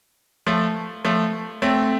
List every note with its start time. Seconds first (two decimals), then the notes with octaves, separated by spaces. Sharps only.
0.46 F3 A3
1.05 F3 A3
1.62 A3 C4